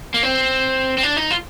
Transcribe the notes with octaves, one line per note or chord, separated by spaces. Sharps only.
A#3
C4
C4
D4
D#4
F4